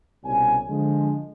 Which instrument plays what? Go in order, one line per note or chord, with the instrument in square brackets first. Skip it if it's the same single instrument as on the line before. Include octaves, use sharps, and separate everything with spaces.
[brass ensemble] C2 B2 G3 C#4 G#5
D3 F3 G#3